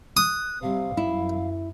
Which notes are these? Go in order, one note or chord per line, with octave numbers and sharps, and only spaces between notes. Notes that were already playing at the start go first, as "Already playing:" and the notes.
D#6 F#6
C3 G3 F5
F#2 E4